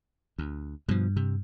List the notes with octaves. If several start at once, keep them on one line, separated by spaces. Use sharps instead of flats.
D2
G2 B2 F3
C3